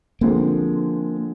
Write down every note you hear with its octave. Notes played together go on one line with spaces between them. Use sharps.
D3 F3 G#3 A#3 C4